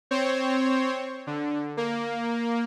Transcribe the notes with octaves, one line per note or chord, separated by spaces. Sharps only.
C4 C5 C#5
D3
A#3